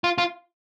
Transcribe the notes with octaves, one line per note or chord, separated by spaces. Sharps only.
F4
F4